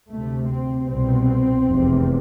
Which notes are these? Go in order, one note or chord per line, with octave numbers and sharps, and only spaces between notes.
D2 C3 A3
C4
C2 B2 C4
F1 E2 C3